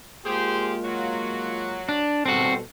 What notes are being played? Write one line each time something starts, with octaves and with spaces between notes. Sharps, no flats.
G#3 A#3 F4 G4 G#4 C5
F#3 F#4
D4
B2 G3 C4 F#4 A4